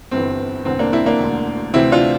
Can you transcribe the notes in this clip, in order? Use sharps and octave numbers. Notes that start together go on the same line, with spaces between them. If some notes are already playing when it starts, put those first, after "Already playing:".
G1 G2 E3 C4
E1 E2 D3 C4
A#3 D4
C4 E4
A#3 D4
E1 D2 D3
D2 C3 E3 C4 E4
D4 F4